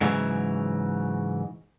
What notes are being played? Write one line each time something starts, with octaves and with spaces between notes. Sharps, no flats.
G#2 C#3 E3 F#3